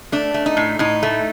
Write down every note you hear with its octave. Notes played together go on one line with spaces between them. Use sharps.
A3 D4
A3
D#4
A2
A2 D#4
A3